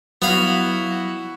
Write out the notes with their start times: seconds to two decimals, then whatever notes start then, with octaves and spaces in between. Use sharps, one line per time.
0.22 F#3 B3 E4 F#4 F5